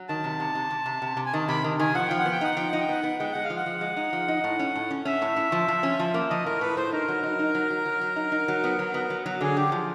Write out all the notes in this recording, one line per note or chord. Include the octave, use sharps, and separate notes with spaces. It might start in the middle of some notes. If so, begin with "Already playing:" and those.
Already playing: F#3
D#3 A5
C3
C3
C3
C3
C3
C3
C3
G#5
D#3 A5
C3 B5
D#3
D#3 G#5
F3 F#5
F3 G5
F#5
B3
G5
D#4 F#5
F3 G5
F#5
D#4
G5
B3 F#5
B3
G#3 G5
G#3 F#5
F5
F3
F#5
F3
G#3
D#4
F3
D#4
A2
C#4
A2
C#4
C#4 E5
A2
A2
F3
F3
C#4
F3
A#3
F3 D#5
A2 A#4
A2 B4
A2 C5
D#4 A#4
F#3
D#4
D#4
F#3
F#3
F#3
F#3
D#4
D#4
F#3
B3
F#3
B3
F#3
F#3
D3 G#4
D3 G4
F3